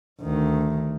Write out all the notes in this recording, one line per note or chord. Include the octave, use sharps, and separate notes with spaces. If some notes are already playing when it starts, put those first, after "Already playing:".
D2 D#3